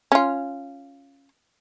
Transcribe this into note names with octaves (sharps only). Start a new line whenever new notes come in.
C#4 F4